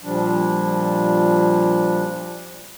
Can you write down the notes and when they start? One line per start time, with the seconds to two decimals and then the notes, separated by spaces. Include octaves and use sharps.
0.03 A#2 F3 G3 D4